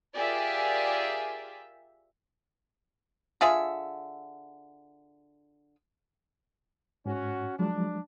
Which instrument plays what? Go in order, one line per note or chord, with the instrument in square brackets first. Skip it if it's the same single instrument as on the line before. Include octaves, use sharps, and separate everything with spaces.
[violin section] F4 G4 G#4 A#4 D5 E5
[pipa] D3 F4 G#4 E5
[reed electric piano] G#2 [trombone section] C#4 F#4
[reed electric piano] F3 F#3 G#3 [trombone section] D4